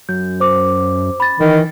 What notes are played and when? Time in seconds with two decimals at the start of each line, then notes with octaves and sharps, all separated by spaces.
0.09 F#2 G6
0.40 C5 D6
1.20 B5 A6
1.40 D#3 E3